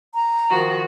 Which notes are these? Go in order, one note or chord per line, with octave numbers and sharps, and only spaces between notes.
A#5
D#3 F3 F#4